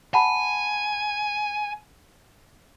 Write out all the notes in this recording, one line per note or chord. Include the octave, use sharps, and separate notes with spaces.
F#5 G#5 A5 B5